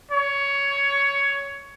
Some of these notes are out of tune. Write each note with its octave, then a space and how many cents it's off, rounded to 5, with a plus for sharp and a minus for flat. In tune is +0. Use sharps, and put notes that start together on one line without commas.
C#5 +15